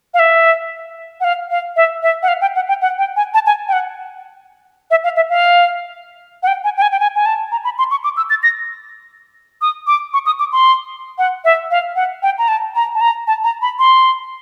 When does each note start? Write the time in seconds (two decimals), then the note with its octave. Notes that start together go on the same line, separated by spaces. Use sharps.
0.14 F5
0.19 E5
1.21 F#5
1.24 F5
1.51 F5
1.76 E5
2.03 E5
2.23 F#5
2.28 F5
2.41 G5
2.55 F#5
2.69 G5
2.81 F#5
2.98 G5
3.16 G#5
3.34 A5
3.46 G#5
3.68 G5
3.73 F#5
4.91 E5
5.04 F5
5.16 E5
5.30 F5
6.43 F#5
6.47 G5
6.64 G#5
6.77 G5
6.82 G#5
6.92 G5
7.00 G#5
7.15 G#5
7.26 A5
7.52 A#5
7.64 B5
7.78 C6
7.91 C#6
8.04 D6
8.17 E6
8.30 A6
8.43 A#6
9.62 D#6
9.87 D6
10.13 C#6
10.26 D#6
10.39 D6
10.52 C6
11.18 F#5
11.45 E5
11.71 F5
11.96 F#5
12.23 G5
12.38 A#5
12.48 A5
12.75 A#5
12.95 A5
13.01 A#5
13.27 A5
13.44 A#5
13.62 B5
13.79 C6